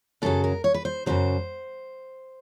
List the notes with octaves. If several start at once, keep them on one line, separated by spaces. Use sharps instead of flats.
F#2 C#3 F#3 A4
A#4
C#5
B4
C5
F#2 C#3 F#3 C5